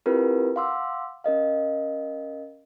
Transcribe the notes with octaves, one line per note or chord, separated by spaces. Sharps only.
C4 E4 F4 G4 A#4 B4
F5 F#5 C6 D6 E6
C#4 A#4 D#5 F5